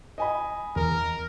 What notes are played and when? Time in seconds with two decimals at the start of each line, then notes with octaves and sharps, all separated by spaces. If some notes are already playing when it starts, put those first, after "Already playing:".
0.18 D#5 G#5 B5
0.76 E2 A#4